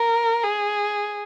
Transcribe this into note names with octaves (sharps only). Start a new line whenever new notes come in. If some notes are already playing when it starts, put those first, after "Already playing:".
Already playing: A#4
G#4